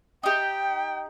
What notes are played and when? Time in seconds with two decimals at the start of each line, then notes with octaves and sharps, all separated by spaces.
0.23 D#4 G4 G5